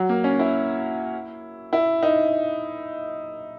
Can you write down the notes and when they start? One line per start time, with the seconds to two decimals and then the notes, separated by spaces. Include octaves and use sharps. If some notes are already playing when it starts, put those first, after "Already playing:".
Already playing: F#3
0.09 A#3
0.24 C#4
0.39 E4
1.73 E4
2.03 D#4